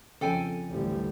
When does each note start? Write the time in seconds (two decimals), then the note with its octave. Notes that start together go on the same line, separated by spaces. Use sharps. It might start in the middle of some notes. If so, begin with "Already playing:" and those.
0.21 F2 C#3 A4 G5 G#5
0.69 A1 D2 G3